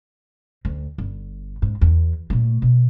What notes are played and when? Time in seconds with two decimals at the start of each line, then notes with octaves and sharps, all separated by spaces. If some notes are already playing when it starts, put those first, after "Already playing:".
0.65 D2
0.98 G1
1.62 G#2
1.81 E2
2.30 A#2 A3
2.62 B2